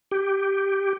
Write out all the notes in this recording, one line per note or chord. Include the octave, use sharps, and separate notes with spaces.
G4